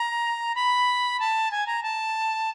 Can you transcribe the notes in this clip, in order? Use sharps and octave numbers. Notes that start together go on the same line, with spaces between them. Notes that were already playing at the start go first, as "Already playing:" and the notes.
Already playing: A#5
B5
A5
G#5
A#5
A5